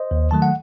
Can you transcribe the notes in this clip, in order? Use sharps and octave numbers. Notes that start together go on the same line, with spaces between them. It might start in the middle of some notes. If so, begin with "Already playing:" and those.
Already playing: C5 D#5
D#2
D#3 F#3 A3 A5
F#5